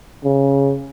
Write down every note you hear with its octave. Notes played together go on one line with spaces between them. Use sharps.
C#3